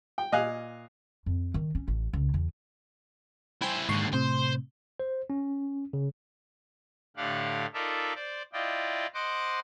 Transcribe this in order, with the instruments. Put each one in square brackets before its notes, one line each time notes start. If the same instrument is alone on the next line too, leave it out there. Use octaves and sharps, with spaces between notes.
[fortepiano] G5
A#2 D#5 F5 G#5 F#6
[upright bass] F2
D#3
C#4
A1
C#2
E2
[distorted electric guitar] E4 C5 [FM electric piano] G5 G#5
[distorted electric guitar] D#2 D3 [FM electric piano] G#2 C#6 C7
[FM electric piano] A2 C3 [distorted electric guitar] C5
[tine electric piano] C5
C#4
C#3
[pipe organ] A2 D3 G4 F5 F#5
D#4 F4 A4 A#4 D5 E5
C5 D5
E4 F4 D5 D#5 G5
C5 D#5 F#5 C6 D6